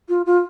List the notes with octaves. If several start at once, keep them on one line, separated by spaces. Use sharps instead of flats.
F4
F4